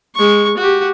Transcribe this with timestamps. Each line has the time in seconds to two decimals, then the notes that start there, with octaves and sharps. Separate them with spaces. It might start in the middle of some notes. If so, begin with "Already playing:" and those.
0.15 G#3 C#6
0.57 F#4 G4